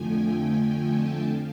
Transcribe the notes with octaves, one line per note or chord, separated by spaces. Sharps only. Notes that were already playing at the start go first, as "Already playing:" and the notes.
Already playing: F2 D3 F3 A3 G5 G#5
G#5
A5
F5